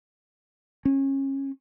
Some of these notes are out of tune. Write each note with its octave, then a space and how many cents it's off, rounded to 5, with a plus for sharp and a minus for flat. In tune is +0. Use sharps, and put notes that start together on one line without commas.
C#4 -25